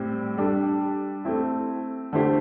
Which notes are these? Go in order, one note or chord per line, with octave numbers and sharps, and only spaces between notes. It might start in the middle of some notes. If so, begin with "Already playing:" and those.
Already playing: A2 G3 C4
G3 D4 A4
A3 C4 E4
D3 A3 E4 G4 C5